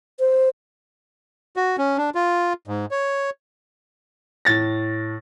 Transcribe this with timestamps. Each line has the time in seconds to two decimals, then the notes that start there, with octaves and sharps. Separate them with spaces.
0.20 C5
1.56 F#4
1.78 C#4
1.97 D4
2.15 F4
2.68 G#2
2.91 C#5
4.45 A2 A6 A#6